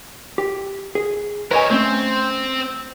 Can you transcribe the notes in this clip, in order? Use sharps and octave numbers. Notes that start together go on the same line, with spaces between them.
G4
G#4
A#4 B4 C#5 D#5 G#5
A3 C4 C#4